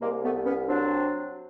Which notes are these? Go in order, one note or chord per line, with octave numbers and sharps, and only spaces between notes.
C2 G#3 A#3
A3 B3
C2
B3 C#4
F#3 C4 D4